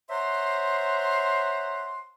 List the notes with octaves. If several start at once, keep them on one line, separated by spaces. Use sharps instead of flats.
C5 C#5 E5 F#5 A#5 C6